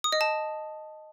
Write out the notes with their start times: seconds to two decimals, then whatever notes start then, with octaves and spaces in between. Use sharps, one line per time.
0.04 D#6
0.12 D#5
0.21 A5